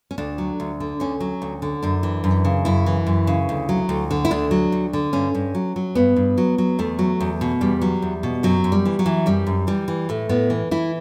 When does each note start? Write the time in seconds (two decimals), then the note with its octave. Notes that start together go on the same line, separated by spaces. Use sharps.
0.11 C#4
0.18 D2 D4
0.38 F#3
0.60 D2
0.80 D3
1.00 D2 C#4
1.20 F#3
1.42 D2
1.62 D3
1.82 F#2 D4
2.03 E3
2.24 F#2
2.45 C#3
2.65 F#2 E4
2.86 E3
3.06 F#2
3.27 C#3
3.49 D2
3.69 F#3
3.89 D2
4.11 D3
4.25 E4
4.31 D2 D4
4.51 F#3
4.72 D2
4.93 D3
5.13 G2 C#4
5.34 G2
5.55 F#3
5.76 F#3
5.95 G2 B3
6.16 G2
6.38 F#3
6.58 F#3
6.79 E2 A3
6.99 F#3
7.20 E2
7.41 B2
7.61 E2 G3
7.81 F#3
8.02 E2
8.23 B2
8.43 F#2 F#3
8.64 F#2
8.72 G3
8.86 E3
8.99 F#3
9.06 E3
9.26 F#2 G3
9.47 F#2
9.67 E3 G3
9.88 E3
10.09 A2 A3
10.29 A2 B3
10.50 E3
10.71 E3 E4